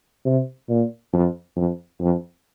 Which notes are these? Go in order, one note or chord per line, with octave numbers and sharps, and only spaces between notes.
C3
A#2
F2
F2
F2